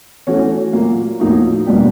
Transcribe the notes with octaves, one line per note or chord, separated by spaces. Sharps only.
E3 A3 C#4 F#4
A#2 F#3 A#3
A2 F3 A#3 D#4 F#4
B2 G3 A#3 D4 G4